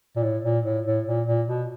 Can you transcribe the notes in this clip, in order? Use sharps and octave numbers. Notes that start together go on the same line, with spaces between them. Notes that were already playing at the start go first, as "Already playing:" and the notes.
A#2
A2
A#2
A2
A2
A#2
A#2
B2